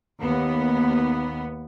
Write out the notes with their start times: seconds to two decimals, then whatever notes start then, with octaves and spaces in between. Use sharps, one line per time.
0.22 D#2 B3